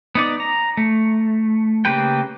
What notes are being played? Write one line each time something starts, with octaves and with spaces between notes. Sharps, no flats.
B3 D#4 D5
A#5
A3
C#3 A#3 G4 B4 G5